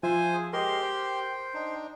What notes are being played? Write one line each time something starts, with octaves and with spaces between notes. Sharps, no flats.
F3 F4 C5 E5 G#5
G#4
G#3 G4 A#4 C5 D#5 C6
C5 G5
D4 D#4